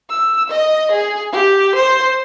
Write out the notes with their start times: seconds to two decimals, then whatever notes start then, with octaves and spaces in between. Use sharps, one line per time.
0.10 E6
0.50 D#5
0.92 G#4
1.33 G4
1.75 C5